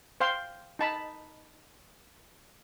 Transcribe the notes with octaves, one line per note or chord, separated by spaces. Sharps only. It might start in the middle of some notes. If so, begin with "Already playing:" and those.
C5 F5 G5 C6
D#4 A5 B5